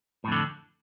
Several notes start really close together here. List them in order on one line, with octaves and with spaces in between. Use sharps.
A2 F2 D3